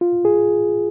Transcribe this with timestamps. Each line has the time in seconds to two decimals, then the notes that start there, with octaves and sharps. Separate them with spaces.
0.01 F4
0.25 G#4